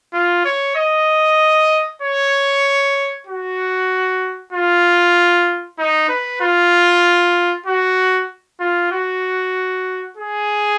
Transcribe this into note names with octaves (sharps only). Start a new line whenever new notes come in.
F4
C#5
D#5
C#5
F#4
F4
D#4
B4
F4
F#4
F4
F#4
G#4